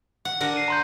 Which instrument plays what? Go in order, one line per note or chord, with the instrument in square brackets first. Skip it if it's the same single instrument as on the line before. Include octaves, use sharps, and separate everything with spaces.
[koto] F#5
D3 A#4 F#5
[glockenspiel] C7 D#7
A#5 C6 G6